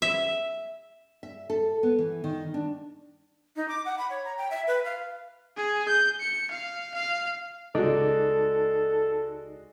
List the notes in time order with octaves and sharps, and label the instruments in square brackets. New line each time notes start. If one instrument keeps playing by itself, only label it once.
[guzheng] E5
[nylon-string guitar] E5
A4
B3
E3
D#3
D4
[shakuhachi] D#4
D6
F#5
B5
C#5
A#5
G5
E5
B4
F5
[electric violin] G#4
G6
C#7
F5
F5
[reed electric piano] C#2 D#4 D5 [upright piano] G#3 F#4 [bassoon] A4